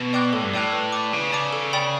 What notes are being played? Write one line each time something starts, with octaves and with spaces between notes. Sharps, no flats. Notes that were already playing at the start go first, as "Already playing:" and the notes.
Already playing: B2
D5 G5 D6 F#6
A2 A4
G2
A2 D5 G5 D6 F#6
B4
D5 A5 D6
C#3 B4
D5 A5 D6
A4
D5 G5 B5